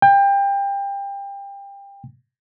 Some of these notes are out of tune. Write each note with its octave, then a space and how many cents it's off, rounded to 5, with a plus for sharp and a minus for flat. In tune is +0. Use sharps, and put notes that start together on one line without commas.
G5 +25